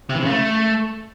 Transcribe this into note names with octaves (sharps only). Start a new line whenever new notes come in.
C3
E3
C3
C#3
A3